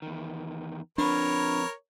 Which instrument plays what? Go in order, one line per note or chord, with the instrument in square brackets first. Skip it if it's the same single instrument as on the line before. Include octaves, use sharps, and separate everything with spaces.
[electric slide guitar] E2 D#3
[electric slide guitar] F3 C4 B4 [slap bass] D4 [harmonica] A#4 C#5 [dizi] B5